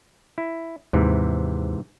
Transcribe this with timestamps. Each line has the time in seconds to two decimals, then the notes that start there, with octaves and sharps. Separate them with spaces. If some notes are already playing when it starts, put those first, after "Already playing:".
0.38 E4
0.93 D#2 G#2 C3 E3